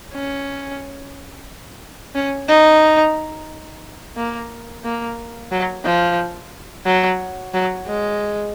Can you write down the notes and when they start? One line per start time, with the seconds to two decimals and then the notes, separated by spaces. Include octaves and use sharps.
0.13 C#4
2.15 C#4
2.48 D#4
4.17 A#3
4.84 A#3
5.51 F#3
5.84 F3
6.86 F#3
7.54 F#3
7.87 G#3